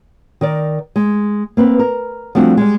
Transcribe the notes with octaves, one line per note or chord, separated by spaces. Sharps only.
D#3 A#4 D5
G#3
A#3 C4 B4
A#4
F3 G3 A3 C4 D4 F#4
G3 G#3